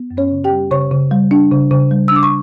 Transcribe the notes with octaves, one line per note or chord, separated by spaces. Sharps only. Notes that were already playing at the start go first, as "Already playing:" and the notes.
Already playing: B3
F#2
C#4 C#5
C#3
G4 G5
G3
C#3 C#5 C#6
C#3
G3
D4
C#3
C#3
G3
E6
D4 D6
C#6